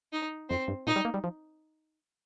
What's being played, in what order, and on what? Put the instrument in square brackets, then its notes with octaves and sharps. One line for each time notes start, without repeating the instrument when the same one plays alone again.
[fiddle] D#4
[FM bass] F2 [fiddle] C4
[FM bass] G2
[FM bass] A#2 [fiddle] D#4
[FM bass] G3
A#3
G3
F3